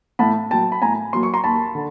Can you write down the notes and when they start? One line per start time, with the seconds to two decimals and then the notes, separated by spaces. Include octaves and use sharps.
0.19 A2 A5 B5
0.50 F#3 A#3 G5 A5
0.72 B5
0.82 A2 G#5 A#5
1.13 F#3 A#3 C6
1.23 C#6
1.34 A#5 C6
1.44 D#2 A5 B5
1.75 D3